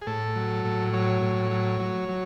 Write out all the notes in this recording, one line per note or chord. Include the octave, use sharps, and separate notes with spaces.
G#4
A2 A4
F#3
A2
F#3 C#5
A2
F#3
F#3
F#3